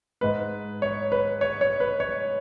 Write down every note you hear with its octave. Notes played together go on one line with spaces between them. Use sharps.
G#2 G#3 B4
C#5
B4
C#5
C#5
B4
C#5